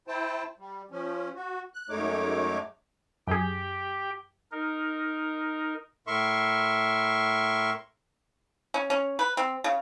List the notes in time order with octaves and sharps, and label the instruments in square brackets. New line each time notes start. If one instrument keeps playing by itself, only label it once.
[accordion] E4 C5 G5 A5
G3
F3 C#4
F#4
F#6
F#2 G#3 A3 D#4 C#5 D6
[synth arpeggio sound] F#2 G#4 [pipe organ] G4 G5
[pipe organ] D#4 A#4
[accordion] A2 A#4 E5 C6 C#6
[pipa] C#4
C#4
B4
C4
C#3